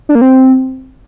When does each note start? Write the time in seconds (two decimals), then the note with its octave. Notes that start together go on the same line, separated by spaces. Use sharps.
0.09 D4
0.15 A#3
0.21 C4